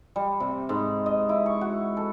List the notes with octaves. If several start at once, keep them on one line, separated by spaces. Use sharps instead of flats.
G3
C3
G#2
D#5
E4
C#6
F#4
A4